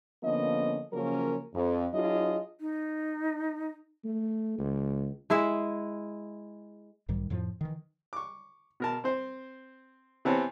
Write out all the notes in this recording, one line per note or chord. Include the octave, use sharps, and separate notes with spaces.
D3 F3 A#3 B3 C#4 D#5
C#3 F3 F#3 A#3 C#4 A#4
F2
F#3 D4 E4 F4 G#4 D#5
D#4
A3
C#2
G#3 E4 G#4 E5
B1 G#2 D#3 G3
F2 A2 F3
D#3 E3
C#6 D6
B2 A#4 A5
C4 C5
C3 E3 B3 C4 C#5 A5